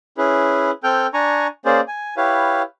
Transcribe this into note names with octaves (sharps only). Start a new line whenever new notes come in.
C#4 E4 G#4 B4
C4 A4 G5 F6 G6
D4 G#5 A#5 C#6
A#3 C#4 G#4 C5 D5
G#5
E4 G4 B4 C#5 F5